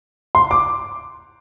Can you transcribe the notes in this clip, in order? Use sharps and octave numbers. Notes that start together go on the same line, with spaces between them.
C6
D6